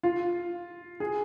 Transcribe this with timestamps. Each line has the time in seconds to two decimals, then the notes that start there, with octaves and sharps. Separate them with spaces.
0.03 F4
1.00 G#4